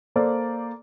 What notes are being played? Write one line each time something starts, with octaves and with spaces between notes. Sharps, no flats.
A#3 A4 C5 D5